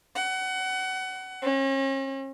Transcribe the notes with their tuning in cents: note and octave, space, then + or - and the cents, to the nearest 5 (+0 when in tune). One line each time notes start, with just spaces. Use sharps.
F#5 +25
C#4 -40